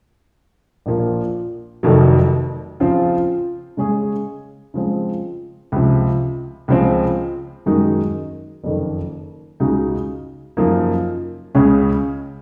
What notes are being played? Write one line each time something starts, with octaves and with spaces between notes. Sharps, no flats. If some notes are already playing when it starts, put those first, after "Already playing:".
A#1 A#2 F3 A#3
F1 F2 C3 D#3 F#3
C#3 F3 C4 F4
C#3 G#3 C#4 G#4
C#3 F3 G#3 C4
C#2 C3 F3
C#2 C#3 F3 G#3 C4
F#2 D#3 G#3 D#4 F#4
F#1 F2 D#3
C#2 C#3 G#3 D#4 F#4
F#2 C#3 F3 A#3 D#4
C#2 C#3 G#3 C#4 G#4